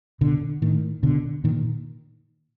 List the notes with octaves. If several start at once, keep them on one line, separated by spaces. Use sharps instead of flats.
B2 D3
A2 D#3
B2 D3
A#2 D#3